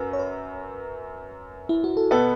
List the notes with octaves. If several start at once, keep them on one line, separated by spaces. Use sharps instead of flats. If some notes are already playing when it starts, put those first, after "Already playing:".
Already playing: F#2 F#3 B4
C#5
B4
E4
F#4
A4
B2 B3 A4 B4